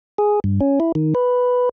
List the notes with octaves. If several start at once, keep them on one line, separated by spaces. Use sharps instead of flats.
G#4
G2
C#4
E4
D#3
B4